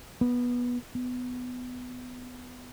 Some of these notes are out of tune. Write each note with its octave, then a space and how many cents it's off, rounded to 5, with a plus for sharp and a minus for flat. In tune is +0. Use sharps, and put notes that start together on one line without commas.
B3 -15
B3 +15